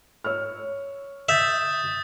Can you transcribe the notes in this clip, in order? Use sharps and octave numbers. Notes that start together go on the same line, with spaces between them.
C#5 E6 F6
E5 D#6 G6 A6